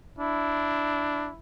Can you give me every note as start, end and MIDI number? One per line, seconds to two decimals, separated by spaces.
0.19 1.30 62
0.19 1.39 64